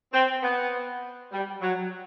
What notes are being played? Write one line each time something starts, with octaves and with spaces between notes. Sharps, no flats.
C4
B3
G3
F#3